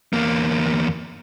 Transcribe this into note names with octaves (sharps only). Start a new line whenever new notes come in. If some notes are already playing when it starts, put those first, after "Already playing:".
E2 A#3